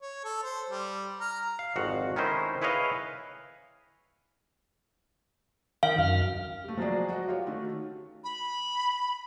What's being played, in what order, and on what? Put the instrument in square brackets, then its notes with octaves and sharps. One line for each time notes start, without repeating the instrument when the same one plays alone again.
[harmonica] C#5
A4
C5
G3
A#5 F6
[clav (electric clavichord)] F5
G#1 F2 F#4 F#5
D#3 C#4 D#4 E4 C5
E4 G#4 B4 C#5 D#5 F5
[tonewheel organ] D#3 G5 [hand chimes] F5
[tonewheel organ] F#2 F6
[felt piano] G3 A3
F3 F#3 G#3 F#4 G#4 D5
F#4 D#5
F4 G4 C#5
D#3 A3 F#4
[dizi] B5